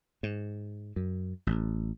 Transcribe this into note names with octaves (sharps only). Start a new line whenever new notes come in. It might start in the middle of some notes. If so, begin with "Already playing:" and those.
G#2
F#2
A1